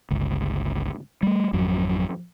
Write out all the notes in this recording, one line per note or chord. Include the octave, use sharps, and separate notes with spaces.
G1 C#2
G3 A3
G#1 F2 F#3